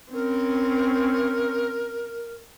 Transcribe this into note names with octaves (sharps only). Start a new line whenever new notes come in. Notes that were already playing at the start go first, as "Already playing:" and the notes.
C4 C#4 A#4